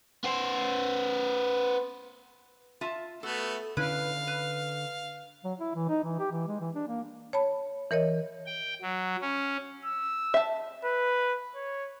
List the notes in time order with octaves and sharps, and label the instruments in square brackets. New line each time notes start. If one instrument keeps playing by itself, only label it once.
[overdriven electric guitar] B3 C5
[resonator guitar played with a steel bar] F4 E5 A5
[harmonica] A3 B3 F#4 [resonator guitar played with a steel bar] A4
[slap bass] D3 C#4 [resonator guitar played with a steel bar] E4 B4 [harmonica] F5
[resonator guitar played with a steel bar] B4
[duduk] F#3
E4
E3
D#4
E3
G4
E3
G#3
E3
D4
A#3
[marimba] C#5 A5 B5
E3 A#4 C#5 D#5
[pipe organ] G5
F#3
C#4
[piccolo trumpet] E6
[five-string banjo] E5 A5
[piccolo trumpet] B4
C#5